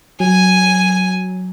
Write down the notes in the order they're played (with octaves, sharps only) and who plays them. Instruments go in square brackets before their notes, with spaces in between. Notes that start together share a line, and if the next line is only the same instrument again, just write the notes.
[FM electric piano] F#3 [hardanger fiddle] G#5